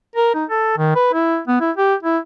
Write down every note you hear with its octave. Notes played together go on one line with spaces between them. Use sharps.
A#4
D#4
A4
D#3
B4
E4
B3
E4
G4
E4